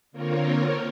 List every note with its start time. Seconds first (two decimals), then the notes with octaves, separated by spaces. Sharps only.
0.12 D3 A#3 C4 F4 A#4 C#5